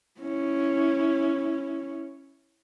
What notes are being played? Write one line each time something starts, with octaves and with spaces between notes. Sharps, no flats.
C#4 E4